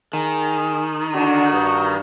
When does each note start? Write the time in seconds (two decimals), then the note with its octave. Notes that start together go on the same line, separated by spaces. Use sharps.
0.13 D#3 G#4
1.15 D3 D4 F#4
1.52 G2